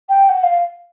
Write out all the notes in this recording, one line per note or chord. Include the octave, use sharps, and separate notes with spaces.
G5
F#5
F5